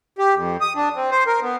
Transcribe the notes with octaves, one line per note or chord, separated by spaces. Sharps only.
G4
F2
D#6
D4
C4
C5
A#4
B3